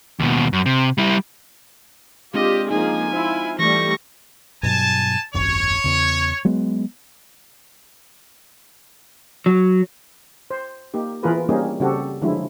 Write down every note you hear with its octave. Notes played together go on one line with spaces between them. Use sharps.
D#2 B2
F#2
C3
G3 E4
G#3 C4 D4 F4 G4 D#5
F3 A#3 D#4 G#4 G#5
E4 F4 C5
E3 G3 A3 C#6 A#6
G2 B2 F#3 G#5 A5
D#1 G#1 F#2 C#5
E2 C#3
F#3 G#3 B3
F#3
C5
A#3 D#4 G4
E3 B3 F4 G#4 A#4 B4
G3 A#3 C4 C#4 D#4 G#4
C#3 G3 C4 F#4 G4 A4
D3 F3 F#3 G#3 E4